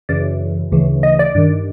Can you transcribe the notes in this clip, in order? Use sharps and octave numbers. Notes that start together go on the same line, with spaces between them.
F#2 C#3 E3 D5
D2 C#3 E3
D#5
D5
G2 D#3